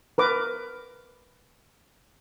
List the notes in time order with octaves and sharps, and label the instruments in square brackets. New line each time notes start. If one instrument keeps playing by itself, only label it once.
[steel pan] A#4 B4 D6